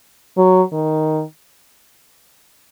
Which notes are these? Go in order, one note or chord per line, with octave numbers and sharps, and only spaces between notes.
F#3
D#3